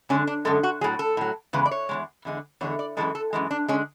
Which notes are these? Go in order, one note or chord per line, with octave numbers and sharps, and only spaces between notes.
F#2 D3 G#3 C#4
D4
F#2 D3 G#3 A4
F#4
A2 F#3 G#4
A4
A2 F#3
E2 C#3 G#3 B4
D5
C#5
E2 C#3 G#3
E2 D3 G#3
E2 D3 G#3 C#5
D5
F#2 C#3 E3 G#3 A4
A4
F#2 C#3 E3 G#3
D4
D3 G#3 C#4